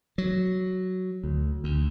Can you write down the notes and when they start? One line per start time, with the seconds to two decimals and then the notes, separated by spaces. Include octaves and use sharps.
0.18 F#3
1.24 D2
1.64 D2